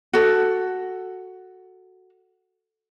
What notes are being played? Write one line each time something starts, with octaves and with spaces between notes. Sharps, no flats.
F#4 A4